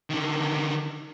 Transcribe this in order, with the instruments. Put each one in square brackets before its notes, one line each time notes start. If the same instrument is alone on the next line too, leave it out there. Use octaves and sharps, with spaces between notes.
[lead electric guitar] D3 D#3